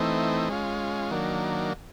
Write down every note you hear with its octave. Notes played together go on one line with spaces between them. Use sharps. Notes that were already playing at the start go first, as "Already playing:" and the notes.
Already playing: E3 A3 C4 D#4
G#3 C#4 F4
D#3 F#3 A#3 D4